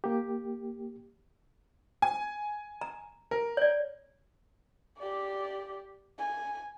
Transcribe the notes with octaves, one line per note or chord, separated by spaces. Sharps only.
A#3 G4
G#5
A#5
A#4
C#5 D5
G4 D5
G#5